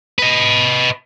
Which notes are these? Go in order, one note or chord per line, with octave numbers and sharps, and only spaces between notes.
B4 D#5